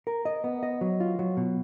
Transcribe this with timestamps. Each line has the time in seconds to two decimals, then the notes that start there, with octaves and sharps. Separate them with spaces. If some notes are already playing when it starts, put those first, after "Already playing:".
0.07 A#4
0.25 D#5
0.44 B3
0.63 D#5
0.81 F#3
1.00 F4
1.19 F#3
1.37 B2